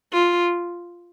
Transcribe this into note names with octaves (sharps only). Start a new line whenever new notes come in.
F4